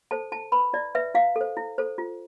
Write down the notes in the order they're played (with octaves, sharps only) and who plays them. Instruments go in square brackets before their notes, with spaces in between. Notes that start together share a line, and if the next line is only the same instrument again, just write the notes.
[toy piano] A4 C5 A5
E4 A5
B4 B5
E4 D5
B4 E5
E4 F5
A4 C5
E4
A4 C5
F4